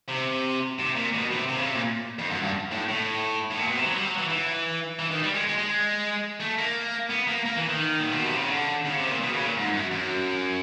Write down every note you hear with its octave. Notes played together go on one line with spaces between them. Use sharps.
C3
C3
A#2
B2
C3
C3
C#3
C3
A#2
F2
F#2
G2
A2
A2
A2
A#2
B2
C3
F#3
G3
F#3
E3
E3
E3
D#3
G3
G#3
G#3
G#3
A3
A#3
B3
A#3
A#3
E3
D#3
A#2
B2
C3
C#3
D3
C#3
C3
A#2
B2
C#3
A#2
G#2
F#2
F#2